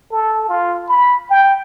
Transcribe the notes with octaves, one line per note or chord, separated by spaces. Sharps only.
A4
F4
B5
G5